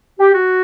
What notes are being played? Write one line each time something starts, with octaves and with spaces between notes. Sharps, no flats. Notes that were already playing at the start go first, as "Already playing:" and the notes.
G4
F#4